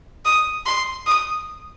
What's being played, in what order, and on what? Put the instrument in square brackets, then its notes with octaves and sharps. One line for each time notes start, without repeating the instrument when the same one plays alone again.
[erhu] D#6
C6
D#6